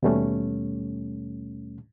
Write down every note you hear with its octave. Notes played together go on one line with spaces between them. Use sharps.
D#2 B2 G3 A3 C#4